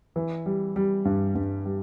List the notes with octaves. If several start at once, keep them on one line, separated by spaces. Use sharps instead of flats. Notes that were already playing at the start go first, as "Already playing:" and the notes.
E3
G3
G3
G2
G2
G3